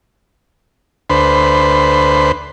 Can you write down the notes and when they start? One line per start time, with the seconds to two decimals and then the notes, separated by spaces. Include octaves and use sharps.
1.10 D2 B4 C5